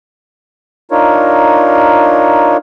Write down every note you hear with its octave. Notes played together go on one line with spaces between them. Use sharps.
D4 D#4 F4 A#4 C#5